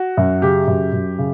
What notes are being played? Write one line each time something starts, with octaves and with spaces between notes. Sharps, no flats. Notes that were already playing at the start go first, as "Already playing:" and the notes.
Already playing: F#4
F#2
C#3 G4
F#2
F#2
C#3